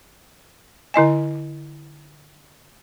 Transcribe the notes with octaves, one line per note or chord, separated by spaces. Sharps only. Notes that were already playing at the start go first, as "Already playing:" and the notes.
D3 E4 D#5 G#5